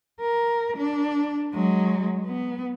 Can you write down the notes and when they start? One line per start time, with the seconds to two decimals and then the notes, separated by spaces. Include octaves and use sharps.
0.21 A#4
0.77 D4
1.54 F#3 G#3
2.26 B3